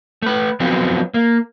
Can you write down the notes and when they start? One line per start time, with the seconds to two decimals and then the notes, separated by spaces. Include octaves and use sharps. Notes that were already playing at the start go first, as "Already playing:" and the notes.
0.22 A3 B4
0.60 F3 F#3 B3 C4 F4
1.14 A#3